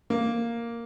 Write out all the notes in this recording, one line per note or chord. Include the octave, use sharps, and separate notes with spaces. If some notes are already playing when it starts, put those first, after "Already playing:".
A#3